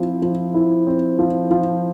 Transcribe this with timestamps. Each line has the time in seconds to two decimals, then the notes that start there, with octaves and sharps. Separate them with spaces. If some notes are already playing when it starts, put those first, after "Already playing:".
Already playing: F3 C4 E4
0.22 F3
0.54 E4
0.87 C4
1.19 F3
1.51 F3